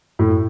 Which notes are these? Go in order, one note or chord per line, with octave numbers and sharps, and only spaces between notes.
A2